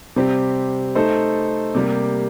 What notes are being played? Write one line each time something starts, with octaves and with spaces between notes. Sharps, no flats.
C3 G3 C4 G4
A3 D#4 A4 C5
C3 G3 A#3